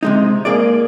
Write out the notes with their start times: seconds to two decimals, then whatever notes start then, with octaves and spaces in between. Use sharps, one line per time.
0.03 C3 G#3 D#4
0.45 A#3 G#4 D5